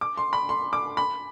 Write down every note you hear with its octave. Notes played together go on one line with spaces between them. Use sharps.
D6
C6
B5
C6
D6
B5